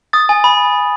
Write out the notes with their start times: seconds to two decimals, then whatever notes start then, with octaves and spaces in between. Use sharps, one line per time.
0.13 D#6 A6
0.29 G#5
0.44 B5